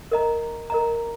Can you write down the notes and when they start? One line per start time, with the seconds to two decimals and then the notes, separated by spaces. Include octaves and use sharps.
0.12 A#4 D#5 A#5
0.70 A#4 D#5 A#5